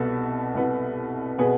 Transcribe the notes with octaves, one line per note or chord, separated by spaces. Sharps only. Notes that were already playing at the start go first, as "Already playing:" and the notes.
Already playing: C2 B2 B3 A4
C2 B2 B3
B2 B3 G#4